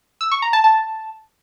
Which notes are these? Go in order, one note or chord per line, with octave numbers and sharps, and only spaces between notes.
E6
C#6
A#5
A5
A5